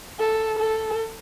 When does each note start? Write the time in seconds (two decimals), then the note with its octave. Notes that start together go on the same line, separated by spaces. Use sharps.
0.19 A4
0.59 A4